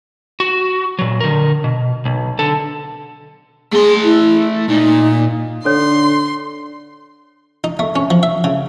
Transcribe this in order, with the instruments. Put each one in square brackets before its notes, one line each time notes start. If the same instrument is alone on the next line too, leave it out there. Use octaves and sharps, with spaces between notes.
[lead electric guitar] F#4
A#2 F#3
D3 A#4
B2
B1
D3 A4
[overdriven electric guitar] A3 C6 [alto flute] G#4
[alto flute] E4
[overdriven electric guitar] A#2 [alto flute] D#4
[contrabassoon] D3 [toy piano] A4 C#5 [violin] C6
[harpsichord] D#4
A3
C#4
F3
E5
C#3